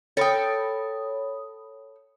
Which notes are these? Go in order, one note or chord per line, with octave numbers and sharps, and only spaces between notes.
A4 C#5 G5 B5 D#6